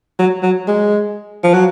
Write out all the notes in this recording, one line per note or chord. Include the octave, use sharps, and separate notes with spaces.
F#3
F#3
G#3
F3
F#3